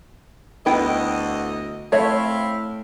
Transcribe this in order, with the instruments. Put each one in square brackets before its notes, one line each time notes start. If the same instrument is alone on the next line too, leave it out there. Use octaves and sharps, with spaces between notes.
[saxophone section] D2 D#5 [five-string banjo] B3 E4 G5
[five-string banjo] A3 C#5 E5 [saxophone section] C4 E4 F5